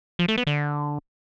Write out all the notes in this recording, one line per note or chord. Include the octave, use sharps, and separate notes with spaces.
F3
A3
B3
D3